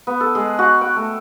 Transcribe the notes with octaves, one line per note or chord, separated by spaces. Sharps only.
B3
A4
G#3
F#4
G5
A3